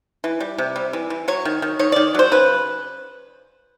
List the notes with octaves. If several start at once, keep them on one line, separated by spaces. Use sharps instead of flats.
E3
G3
C3
G3
E3
E3
F#3 C#5
D#3
D#3
D#3 C#5
D#3 D5
F#3 C5
C#3 B4